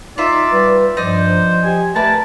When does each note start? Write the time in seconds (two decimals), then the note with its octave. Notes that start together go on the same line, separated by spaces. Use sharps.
0.18 D#4 F4 D5 E5
0.52 G3 B4
0.97 G2 F3 D#4 C5 D5
1.64 G4 G#5
1.96 A3 A#4 B4 D5 A5